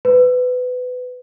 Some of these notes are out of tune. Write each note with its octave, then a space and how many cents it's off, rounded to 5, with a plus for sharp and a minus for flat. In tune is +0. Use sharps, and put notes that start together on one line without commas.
B4 +20